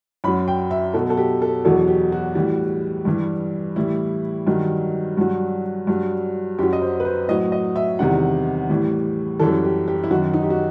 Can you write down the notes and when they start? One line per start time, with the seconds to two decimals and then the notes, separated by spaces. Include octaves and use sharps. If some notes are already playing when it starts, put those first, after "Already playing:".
0.24 F#2 B5
0.27 F#3
0.48 G5
0.71 E5
0.94 B2 F#3 A4
1.10 A4
1.17 G4
1.42 A4
1.65 E2 B2 F#3 A4
1.88 G4
2.12 F#4
2.35 A2 E3 G3
3.05 G2 E3 G3
3.76 A2 E3 G3 E4
4.47 G2 D#3 F#3
5.17 G2 F#3 F#4
5.87 G2 F#3
6.58 F#2 F#3 G4
6.73 D#5
6.82 C5
7.00 B4
7.05 C5
7.28 A2 F#3 D#5
7.52 D#5
7.76 E5
7.99 E2 C3 D#3 G3 F#5
8.69 A2 E3 G3
9.39 F#2 E3 G3 A4
9.64 G4
9.88 G4
10.04 E4
10.11 F#2 D#3 F#3 F#4
10.34 D#4
10.43 G4
10.50 F#4